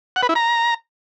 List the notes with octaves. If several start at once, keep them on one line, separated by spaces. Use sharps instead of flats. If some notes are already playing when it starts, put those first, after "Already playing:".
F#5
B4
E4
A#5